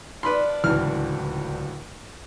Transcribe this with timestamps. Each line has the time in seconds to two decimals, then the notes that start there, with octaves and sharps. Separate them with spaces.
0.23 F3 D4 B4 B5 C6
0.64 D1 C#2 E3 F6